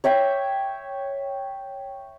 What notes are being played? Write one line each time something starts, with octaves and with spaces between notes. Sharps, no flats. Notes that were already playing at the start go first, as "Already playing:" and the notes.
C#5 E5 G5 D6